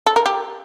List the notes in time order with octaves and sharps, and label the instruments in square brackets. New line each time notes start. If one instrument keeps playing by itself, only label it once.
[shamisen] A4
A#4
G4